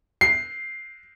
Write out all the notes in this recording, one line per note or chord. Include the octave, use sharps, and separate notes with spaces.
C7